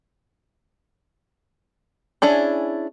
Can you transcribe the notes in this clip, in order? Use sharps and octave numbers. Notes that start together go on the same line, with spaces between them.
C#4 D4 E4 G#4